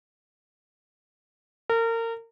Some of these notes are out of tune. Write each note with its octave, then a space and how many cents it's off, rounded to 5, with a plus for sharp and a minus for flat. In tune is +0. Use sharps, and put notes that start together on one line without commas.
A#4 -30